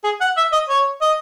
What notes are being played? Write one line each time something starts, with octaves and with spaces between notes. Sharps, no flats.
G#4
F#5
E5
D#5
C#5
D#5